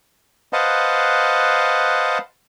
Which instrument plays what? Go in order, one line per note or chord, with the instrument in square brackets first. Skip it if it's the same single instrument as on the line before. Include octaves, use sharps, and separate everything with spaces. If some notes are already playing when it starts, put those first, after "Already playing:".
[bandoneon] B4 C5 D#5 F5 F#5 A5